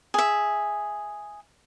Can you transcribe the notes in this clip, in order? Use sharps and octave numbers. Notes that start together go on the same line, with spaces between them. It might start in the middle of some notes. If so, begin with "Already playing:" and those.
G#4 E5